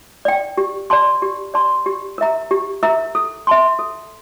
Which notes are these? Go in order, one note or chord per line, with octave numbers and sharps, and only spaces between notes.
D5 G5
G4
D5 A5 C6
G4
D5 A5 C6
G4
A#4 E5 A#5
G4
A#4 E5 A#5
A4
E5 A5 C6
A4